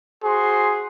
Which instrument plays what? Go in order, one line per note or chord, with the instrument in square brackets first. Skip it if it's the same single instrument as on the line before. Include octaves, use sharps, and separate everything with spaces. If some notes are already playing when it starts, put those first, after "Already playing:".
[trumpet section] F#4 C5 C6 [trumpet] G#4